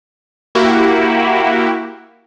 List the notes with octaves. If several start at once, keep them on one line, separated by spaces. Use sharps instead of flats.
A#3 E4 F#4 G4